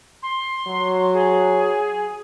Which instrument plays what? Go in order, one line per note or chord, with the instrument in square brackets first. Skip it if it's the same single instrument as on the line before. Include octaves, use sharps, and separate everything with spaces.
[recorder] C6
[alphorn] F#3
[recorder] G#4